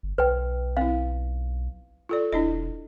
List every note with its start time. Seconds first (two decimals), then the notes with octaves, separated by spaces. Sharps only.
0.03 G1
0.18 B1 B4 G5
0.77 C4 E4 F5
2.09 F4 A4 D5
2.33 E1 D4 E4 D#5